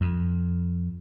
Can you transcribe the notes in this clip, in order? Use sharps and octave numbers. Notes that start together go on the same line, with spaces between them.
F2